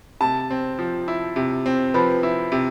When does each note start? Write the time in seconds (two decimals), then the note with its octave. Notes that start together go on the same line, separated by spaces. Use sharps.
0.21 C3 A5
0.51 C4
0.79 F3
1.08 E4
1.36 C3
1.66 C4
1.94 F3 B4
2.23 E4
2.52 C3